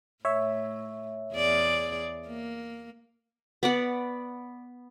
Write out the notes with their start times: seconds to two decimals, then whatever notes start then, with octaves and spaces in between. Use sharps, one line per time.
0.25 A2 C#5 E5
1.34 E2 G#4 D5
2.28 A#3
3.63 B3 D5 F#5